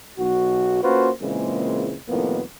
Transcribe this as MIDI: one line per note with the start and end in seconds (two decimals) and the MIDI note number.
0.19 0.81 35
0.19 0.81 66
0.83 1.10 58
0.83 1.10 61
0.83 1.10 65
0.83 1.10 66
0.83 1.10 71
0.83 1.10 72
1.20 1.95 46
1.20 1.95 49
1.20 1.95 52
1.20 1.95 56
1.20 1.95 58
1.20 1.95 60
2.08 2.41 36
2.08 2.41 41
2.08 2.41 45
2.08 2.41 51
2.08 2.41 58
2.08 2.41 59